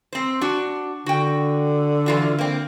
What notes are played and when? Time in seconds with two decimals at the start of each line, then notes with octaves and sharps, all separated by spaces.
0.13 C4 C5
0.41 D4 F#4
1.06 D3 F#4 G5
2.06 E3 F4 F#4
2.39 A#3 C4